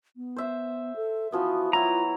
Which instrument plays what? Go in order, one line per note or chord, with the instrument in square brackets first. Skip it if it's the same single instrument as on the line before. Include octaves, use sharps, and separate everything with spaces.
[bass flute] B3
[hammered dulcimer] C5 E5
[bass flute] A4
[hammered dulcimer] E3 F3 B3 [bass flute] F#4
[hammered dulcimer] F#3 E4 [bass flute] F4 [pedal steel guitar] A#5